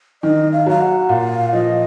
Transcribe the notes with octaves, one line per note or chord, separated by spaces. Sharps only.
D#3 D#5
F5
F#3 F5
F#5
A#2 F5
F3 D#5